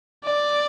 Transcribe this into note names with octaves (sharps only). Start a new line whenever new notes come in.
D5